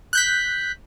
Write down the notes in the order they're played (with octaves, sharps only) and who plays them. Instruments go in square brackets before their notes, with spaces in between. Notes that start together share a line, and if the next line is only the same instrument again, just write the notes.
[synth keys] F#6 G6 B6